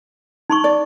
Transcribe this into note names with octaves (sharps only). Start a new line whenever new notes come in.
D#4 C6 C#6
D5